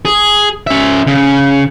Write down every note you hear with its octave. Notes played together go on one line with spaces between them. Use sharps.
G#4
C#4 E5
C#3